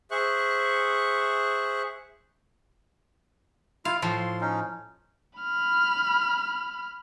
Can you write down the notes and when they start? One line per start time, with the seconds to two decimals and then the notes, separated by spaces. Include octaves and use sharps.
0.11 G#4 C5 E5 C#6 F#6
3.85 E4 F4 F5
4.02 A2 F3 C6
4.41 C#4 D#4
5.39 B5 F6